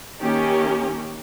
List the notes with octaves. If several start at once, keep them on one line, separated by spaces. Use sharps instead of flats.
D#3 A#3 C#4 G4